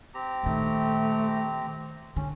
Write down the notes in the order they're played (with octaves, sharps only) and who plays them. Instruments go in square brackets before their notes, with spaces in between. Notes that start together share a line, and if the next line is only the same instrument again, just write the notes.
[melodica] C4 G4 A#5
[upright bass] A#2 D#3 [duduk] A3
[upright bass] D3 [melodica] C#4